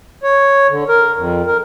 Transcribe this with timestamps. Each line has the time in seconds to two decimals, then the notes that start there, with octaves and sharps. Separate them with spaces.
0.23 C#5
0.70 D3
0.89 A#4
1.17 F2
1.46 A#4